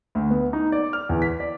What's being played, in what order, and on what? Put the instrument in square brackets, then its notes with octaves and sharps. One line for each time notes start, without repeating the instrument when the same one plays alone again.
[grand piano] D2
B3
D#4
D5
F6
E2
B6
D5